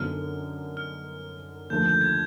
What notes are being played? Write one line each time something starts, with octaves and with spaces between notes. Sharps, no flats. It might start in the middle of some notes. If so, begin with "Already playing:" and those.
Already playing: F#2 D3 F#3 B3 D#4 F6
F6
D#2 D3 F3 A3 G6
G6
G#6